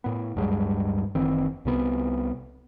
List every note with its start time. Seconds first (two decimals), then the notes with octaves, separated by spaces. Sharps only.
0.04 A2 B3
0.36 D1 G2 F#3 G#3
1.15 F#1 D#3 E3 C4
1.65 C2 C3 B3